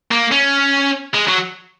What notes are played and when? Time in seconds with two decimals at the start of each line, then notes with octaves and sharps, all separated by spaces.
0.11 A#3
0.31 C#4
1.14 G#3
1.28 F#3